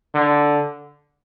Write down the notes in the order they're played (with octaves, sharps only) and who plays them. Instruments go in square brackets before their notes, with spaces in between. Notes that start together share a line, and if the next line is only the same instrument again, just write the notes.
[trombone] D3